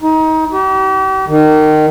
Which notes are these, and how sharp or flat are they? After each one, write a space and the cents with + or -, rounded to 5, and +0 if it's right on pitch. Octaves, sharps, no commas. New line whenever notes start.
D#4 +25
G4 -40
D#3 -20